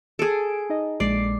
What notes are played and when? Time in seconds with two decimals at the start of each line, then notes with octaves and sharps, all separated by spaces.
0.19 G#4 A4 D7
0.70 D#4 D#5
1.00 A#1 G#3 D5 C7